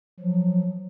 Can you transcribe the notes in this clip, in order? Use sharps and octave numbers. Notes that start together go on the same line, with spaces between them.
F3 F#3